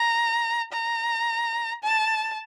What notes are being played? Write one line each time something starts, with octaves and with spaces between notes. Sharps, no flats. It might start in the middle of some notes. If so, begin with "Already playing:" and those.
Already playing: A#5
A#5
A5